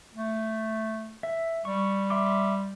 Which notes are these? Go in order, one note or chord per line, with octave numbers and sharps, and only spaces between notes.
A3
E5
G3 C#6
E5 C6 D6